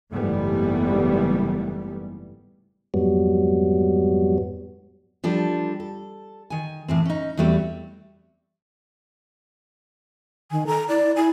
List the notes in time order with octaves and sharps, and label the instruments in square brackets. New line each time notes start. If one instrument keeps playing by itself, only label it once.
[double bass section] F#1 G#2 E3 G3 A3 B3
[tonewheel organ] F2 G#2 F#3 G3 B3
[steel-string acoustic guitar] F3 G3 D4 A4
A4
D#3 G#5
A2 E3 C4
C#4 D#4
E2 F#3 G3 A3 C4
[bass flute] D#3 [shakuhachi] G#5
[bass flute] A4 [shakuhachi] A#5
[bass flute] E4 [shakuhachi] D5
[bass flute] E4
[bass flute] E4 [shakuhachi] G#5